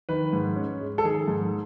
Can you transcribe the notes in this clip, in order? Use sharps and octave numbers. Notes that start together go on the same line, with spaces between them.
D#3 B4
G#2
C#4
G#3
A4
D#3 G#4
G#2